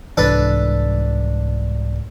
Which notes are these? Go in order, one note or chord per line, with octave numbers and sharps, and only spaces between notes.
C2 G#2 E3 D4 A4 B4